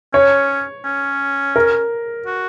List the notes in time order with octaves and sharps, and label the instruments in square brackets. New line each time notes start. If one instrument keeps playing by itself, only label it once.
[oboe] C#4 [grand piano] C#5
[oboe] C#4
[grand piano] A#4
[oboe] F#4